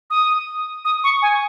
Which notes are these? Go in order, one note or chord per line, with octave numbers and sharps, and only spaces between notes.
D#6
D#6
C#6
G#5